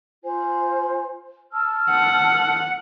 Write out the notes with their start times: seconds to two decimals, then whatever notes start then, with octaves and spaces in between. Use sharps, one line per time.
0.23 F4 C5 G#5
1.52 A5 E6 F6
1.91 F#5